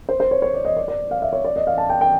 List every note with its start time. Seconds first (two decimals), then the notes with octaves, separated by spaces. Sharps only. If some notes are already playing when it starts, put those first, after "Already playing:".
0.09 C5
0.20 C5
0.31 C#5
0.42 C#5
0.54 D5
0.65 D#5
0.76 D5
0.88 D5
1.11 F5
1.22 E5
1.33 C#5
1.44 D5
1.56 D#5
1.67 F5
1.78 A5
1.89 G5
2.01 G5